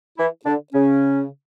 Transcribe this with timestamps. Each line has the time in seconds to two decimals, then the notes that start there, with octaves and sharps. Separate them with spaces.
0.17 E3 E4
0.45 D3 D4
0.73 C#3 C#4